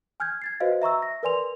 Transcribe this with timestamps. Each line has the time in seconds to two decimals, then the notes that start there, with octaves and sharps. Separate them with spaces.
0.20 G#5 F6 G6 G#6
0.42 G#6 A6 C7
0.60 F#4 B4 C5 D#5 F5
0.82 E5 A#5 C#6 E6
1.02 A#6
1.23 A#4 B4 D5 G#5 C6 F7